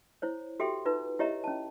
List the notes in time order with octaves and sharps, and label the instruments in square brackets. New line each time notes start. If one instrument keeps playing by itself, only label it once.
[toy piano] E4 C5 C#5
F#4 G4 A4 E5 G5 C6
D#4 F4 B4
E4 G4 C#5 D#5 E5 A#5
C#4 A5